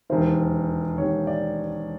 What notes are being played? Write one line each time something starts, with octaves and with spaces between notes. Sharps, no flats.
E1 D#2 D#3 C5
E1 D#2 D#3 C#5
D5